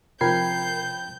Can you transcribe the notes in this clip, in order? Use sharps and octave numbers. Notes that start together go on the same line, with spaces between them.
C3 F3 A#4 G5 B5 G6 G#6 C7